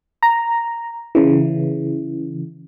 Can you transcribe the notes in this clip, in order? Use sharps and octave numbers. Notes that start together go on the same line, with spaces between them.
A#5
C#3 E3